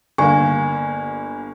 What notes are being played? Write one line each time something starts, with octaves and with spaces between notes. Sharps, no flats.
G1 A#3 G#5 C#6